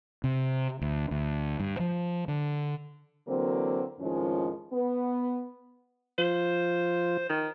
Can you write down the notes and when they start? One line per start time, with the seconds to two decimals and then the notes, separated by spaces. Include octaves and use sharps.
0.24 C3
0.81 D2
1.11 D2
1.60 G2
1.79 F3
2.28 D3
3.28 D3 E3 F#3 A#3 C4
3.99 F2 A2 D#3 F3 G#3 C#4
4.73 B3
6.18 F3 F4 C5
7.29 D#3